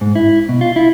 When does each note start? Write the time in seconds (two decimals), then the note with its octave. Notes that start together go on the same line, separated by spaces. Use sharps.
0.01 G#2
0.15 E4
0.49 B2
0.61 F4
0.76 E4